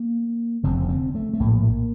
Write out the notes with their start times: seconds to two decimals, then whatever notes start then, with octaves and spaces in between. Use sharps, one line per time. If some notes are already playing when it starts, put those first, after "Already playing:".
Already playing: A#3
0.64 F1 F2 D3 C4
0.89 C4
1.15 A3
1.34 A3
1.40 A#1 A2 A#3